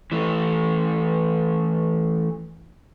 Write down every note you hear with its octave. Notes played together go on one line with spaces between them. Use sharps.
E3 A3